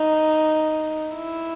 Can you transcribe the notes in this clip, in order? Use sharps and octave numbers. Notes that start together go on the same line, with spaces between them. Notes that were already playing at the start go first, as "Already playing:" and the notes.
Already playing: D#4
E4